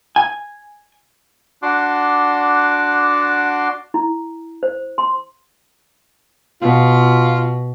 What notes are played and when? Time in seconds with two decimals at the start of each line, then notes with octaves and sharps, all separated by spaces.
0.16 G#5
1.63 D4 F#4 F#5 A5 C6 D6
3.94 E4
4.63 C5
4.98 C6
6.62 B2 F4